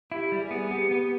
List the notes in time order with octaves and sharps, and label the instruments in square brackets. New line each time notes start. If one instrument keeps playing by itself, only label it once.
[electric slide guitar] E4 [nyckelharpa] G4
[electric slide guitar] G3
[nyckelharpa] G#4
[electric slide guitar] B3
[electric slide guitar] B3 [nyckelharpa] G4
[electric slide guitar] B3